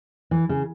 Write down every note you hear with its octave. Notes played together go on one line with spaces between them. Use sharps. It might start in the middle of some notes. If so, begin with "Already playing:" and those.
E3
C#3